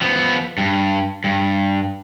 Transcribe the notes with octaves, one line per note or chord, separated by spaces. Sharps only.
F3 B3
G2
G2